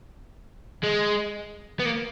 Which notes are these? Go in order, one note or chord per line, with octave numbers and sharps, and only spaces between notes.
G#3
B3
A#3